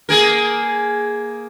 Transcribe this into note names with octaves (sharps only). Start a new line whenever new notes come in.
A#3 G#4 A#4